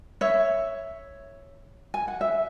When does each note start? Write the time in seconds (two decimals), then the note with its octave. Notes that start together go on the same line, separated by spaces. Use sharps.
0.21 C#5 E5
1.94 G#5
2.08 F#5
2.21 E5